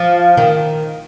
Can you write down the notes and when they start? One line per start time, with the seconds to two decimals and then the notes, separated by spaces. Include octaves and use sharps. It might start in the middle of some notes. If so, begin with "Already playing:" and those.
Already playing: F3
0.37 D#3